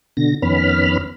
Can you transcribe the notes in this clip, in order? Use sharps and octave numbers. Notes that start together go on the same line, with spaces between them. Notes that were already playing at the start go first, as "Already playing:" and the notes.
B2 D3 A#6
F2 D#3 B3 C#4 B5 F6